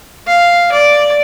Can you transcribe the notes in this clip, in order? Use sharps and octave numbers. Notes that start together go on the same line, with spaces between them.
F5
D5